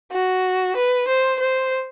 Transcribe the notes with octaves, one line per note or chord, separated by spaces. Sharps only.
F#4
B4
C5
C5